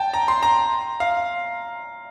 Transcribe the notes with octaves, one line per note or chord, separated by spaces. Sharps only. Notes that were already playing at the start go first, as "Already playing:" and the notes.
Already playing: G5 A5
A#5
C6
A#5
F5